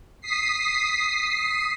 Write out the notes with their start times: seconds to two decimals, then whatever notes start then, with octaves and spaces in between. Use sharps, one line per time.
0.21 D#6 B6 C7